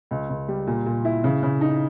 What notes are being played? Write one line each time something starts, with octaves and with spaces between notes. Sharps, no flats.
C#2
C#2
G3
A#2
A#2
E4
C#3
C#3
D#4